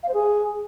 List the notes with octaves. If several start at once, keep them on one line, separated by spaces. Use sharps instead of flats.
F5
C5
G#4